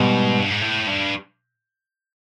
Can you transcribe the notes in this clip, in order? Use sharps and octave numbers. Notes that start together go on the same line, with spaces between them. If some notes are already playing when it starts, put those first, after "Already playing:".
Already playing: G#2 B2 G3 B3
G2
G#2
A2
G2